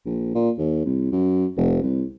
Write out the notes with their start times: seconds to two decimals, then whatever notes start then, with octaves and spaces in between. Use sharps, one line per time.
0.06 A#1
0.35 A#2
0.58 D#2
0.85 C2
1.12 F#2
1.57 F1
1.82 C2